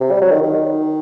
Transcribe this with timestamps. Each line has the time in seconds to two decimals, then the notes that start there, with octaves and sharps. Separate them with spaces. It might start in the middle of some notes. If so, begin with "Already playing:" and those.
0.01 C3
0.11 G3
0.21 F#3
0.32 D#3
0.42 D#3